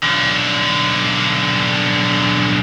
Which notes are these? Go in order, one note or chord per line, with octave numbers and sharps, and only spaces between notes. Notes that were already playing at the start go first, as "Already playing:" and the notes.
B1 D3